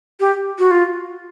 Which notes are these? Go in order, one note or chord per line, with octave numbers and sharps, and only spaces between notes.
G4
F#4
F4